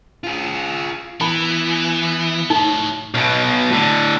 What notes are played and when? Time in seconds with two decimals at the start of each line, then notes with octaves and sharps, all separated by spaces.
0.24 F4 G#4
1.21 E3 B3 B5
2.50 A2 F#3 D#4
3.14 B1 B2
3.71 A2 D3